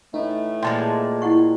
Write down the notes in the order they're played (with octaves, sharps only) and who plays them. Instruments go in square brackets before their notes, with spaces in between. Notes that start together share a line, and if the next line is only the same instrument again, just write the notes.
[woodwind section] A2 E3 A3 [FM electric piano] D#4
[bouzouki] A#2 F3 G#3 [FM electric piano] G5 A5 [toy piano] C6
[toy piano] E4 F#5 C#6